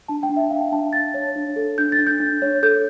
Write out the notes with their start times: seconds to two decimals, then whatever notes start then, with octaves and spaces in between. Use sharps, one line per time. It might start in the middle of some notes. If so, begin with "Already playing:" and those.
0.08 D4 A5
0.23 G5
0.29 D4
0.36 E5
0.51 D4 F5
0.61 G5
0.72 D4 A5
0.93 D4 A6
1.14 C#5
1.36 D4
1.56 A4
1.78 D4 G6
1.92 A6
1.99 D4
2.07 G6
2.20 D4
2.42 C#5
2.63 A4 G6